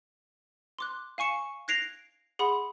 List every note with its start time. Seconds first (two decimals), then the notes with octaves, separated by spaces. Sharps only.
0.79 C6 D6 F#6
1.18 F5 G#5 C#6 C#7 E7
1.68 F#6 G#6 A#6 C7 D7 F7
2.39 G#4 F#5 B5 C6 D#6